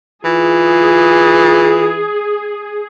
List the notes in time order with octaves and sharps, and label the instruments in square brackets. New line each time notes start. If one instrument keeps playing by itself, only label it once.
[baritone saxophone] E3 [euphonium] F4 [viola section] G#4